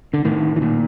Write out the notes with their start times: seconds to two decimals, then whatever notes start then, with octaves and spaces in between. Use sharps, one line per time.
0.13 D3
0.25 A2 D#3
0.56 E3
0.61 A#2 D#3